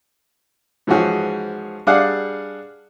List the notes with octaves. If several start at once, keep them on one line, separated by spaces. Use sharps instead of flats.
G#2 E3 F3 C#4 F#4 G#4
G3 D4 G#4 D5 F5 F#5